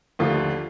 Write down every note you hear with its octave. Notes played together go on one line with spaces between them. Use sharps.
D#2 D3 F3 A3 F4